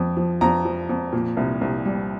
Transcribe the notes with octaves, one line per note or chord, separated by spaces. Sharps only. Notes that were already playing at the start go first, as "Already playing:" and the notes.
Already playing: F2 F3
F3
F2 A#5
F3
F2
A#2
C2
C2
G3